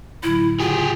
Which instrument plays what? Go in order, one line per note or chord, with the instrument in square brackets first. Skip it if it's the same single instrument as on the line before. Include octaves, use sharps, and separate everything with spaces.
[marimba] A2 D3 F#3 [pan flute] E4
[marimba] A2 C#3 F#5 [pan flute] F4 [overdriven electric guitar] G4 G#4